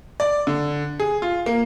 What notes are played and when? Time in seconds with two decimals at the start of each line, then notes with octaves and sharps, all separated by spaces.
0.20 D5
0.47 D3
1.00 G#4
1.22 F4
1.46 A#3